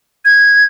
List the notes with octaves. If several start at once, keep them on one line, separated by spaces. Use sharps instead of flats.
G#6